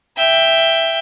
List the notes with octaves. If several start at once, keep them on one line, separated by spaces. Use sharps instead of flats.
E5 G5